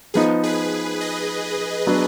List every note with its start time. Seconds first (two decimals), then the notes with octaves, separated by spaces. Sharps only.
0.14 F3 B3 D#4 G#4 B4
0.43 G#4 B4
1.01 B4 D#5
1.87 F#3 B3 D4